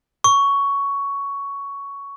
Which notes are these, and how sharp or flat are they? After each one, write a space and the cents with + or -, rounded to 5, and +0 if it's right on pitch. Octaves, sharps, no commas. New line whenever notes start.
C#6 +10